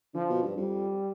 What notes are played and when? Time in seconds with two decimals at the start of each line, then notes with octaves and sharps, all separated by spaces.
0.14 D3 F3
0.29 B2
0.43 G2
0.57 F2 G3